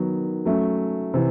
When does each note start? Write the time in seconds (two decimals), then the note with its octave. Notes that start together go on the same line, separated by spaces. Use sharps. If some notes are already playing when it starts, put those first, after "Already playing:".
Already playing: D#3 F#3 B3
0.45 F#3 A3 C#4
1.14 C3 E3